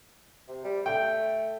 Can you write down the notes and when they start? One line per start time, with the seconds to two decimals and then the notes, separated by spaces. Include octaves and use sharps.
0.48 C3
0.64 G3
0.86 A3 G5